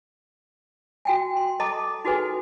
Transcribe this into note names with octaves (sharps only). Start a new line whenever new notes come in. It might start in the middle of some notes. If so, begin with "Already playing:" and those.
F#4 G5 G#5
C6
A4 D#5 A5 A#5 D6 D#6
D#4 F#4 G#4 A4 B4 G#5